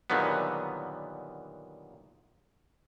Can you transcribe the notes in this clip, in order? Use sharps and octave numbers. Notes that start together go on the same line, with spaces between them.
A#2 D3 D#3 F#3 G3 B3